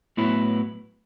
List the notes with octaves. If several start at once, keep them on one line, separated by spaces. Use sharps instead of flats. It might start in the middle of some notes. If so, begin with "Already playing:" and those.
A2 F#3 B3 E4 B4